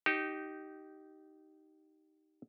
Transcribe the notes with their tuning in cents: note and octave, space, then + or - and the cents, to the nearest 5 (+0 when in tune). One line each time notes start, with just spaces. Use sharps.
D#4 +0 G4 -20